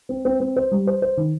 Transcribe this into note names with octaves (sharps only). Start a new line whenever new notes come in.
C4
C4
C4
C5
G3
C5
C5
D#3